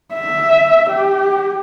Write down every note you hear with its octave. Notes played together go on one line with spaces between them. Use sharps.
E5
G4